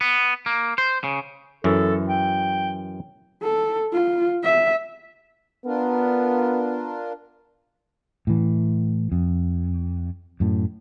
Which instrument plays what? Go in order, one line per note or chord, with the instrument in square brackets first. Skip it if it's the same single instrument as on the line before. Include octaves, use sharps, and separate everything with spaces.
[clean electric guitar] B3
A#3
C5
C#3
[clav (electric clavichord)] F#2 E3 [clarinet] A4
[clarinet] G5
[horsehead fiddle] A4
F4
E5
[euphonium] B3 [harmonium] D4 F4 A#4
[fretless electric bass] A2 E3
F2
F#2 A2